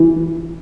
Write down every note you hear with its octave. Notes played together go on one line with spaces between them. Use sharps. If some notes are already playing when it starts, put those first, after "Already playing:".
Already playing: E3